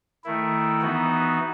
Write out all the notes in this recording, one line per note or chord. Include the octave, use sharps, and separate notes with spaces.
D#3 A3 E4
E3 B3 D#4 F#4